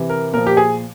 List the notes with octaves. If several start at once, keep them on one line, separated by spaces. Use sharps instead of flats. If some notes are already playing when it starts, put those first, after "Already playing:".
Already playing: C3 E3
A#4
A#2 F3 A#4
G4
G#4